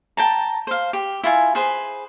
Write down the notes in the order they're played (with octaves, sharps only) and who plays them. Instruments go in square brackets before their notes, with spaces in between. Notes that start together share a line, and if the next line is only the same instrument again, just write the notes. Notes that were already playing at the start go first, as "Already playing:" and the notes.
[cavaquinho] G5 A5 A#5
C5 F5
G4
E4 F4 G#5
G#4 B4 C5